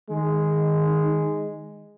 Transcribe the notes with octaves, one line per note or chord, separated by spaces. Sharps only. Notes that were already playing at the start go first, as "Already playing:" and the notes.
D#3 G#3